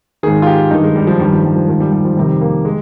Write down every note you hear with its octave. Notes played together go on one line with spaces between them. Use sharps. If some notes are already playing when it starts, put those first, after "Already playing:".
G#2 D#3 G#4
F4
G4
G2 D#3 D#4
G#3
G3
F3
G2 D#3 G3
F3
G3
F3
G#2 D#3 F3
G3
G3
F3
F2 C3 D#3 G3
A#3
G#3